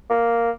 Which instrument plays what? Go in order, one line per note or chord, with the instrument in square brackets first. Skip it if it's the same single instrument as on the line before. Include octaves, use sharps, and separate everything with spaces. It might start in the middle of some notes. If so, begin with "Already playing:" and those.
[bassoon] A#3